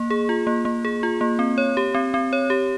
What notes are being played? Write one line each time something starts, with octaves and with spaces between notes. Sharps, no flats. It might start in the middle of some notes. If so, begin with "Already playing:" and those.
Already playing: A#3
G#4
F4
A#3
A#3
G#4
F4
A#3
C4
C#5
G4
C4
C4
C#5
G4